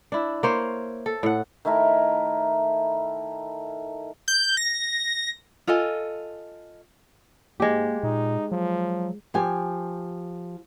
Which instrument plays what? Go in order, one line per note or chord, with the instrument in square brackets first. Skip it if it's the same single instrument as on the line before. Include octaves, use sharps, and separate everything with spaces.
[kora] D4 E4
A#3 C5 C#5
A4
A2 F#5
[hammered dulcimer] D#3 A3 E4 A#4
[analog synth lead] G6
A#6
[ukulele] F4 A4 D#5 G#5
[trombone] G#2 [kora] G#3 G4 [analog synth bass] A#3
[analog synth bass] A#2 [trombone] D#4
[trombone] F3 [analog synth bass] F#3
[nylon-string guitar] F3 G4 G#5